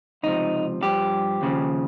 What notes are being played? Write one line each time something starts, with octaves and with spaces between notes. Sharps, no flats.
C#2 C3 F3 D#4
G2 F3 G4
D#2 C#3 F3